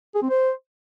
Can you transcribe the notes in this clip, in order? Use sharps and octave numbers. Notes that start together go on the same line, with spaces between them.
G#4
C4
C5